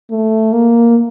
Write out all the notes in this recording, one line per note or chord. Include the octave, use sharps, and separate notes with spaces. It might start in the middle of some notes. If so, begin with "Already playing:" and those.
A3
A#3